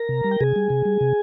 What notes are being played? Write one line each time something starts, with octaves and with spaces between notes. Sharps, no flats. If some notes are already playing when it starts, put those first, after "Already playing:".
Already playing: A#4 A#5
C3
G3
G5
C3 G#4 G#5
G3
C3
G3
C3